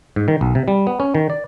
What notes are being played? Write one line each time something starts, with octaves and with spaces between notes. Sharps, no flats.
G#2
D#3
B1
C3
G3
B3
C#4
D#3
D5